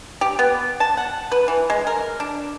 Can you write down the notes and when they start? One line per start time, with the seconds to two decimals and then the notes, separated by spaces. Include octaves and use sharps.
0.21 G4
0.39 B3
0.80 A5
0.97 F#5
1.32 B4
1.48 E3
1.70 G#3
1.87 A#4
2.20 D4